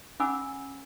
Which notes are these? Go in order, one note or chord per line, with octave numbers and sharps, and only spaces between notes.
C#4 F#5 G#5 B5 D6 E6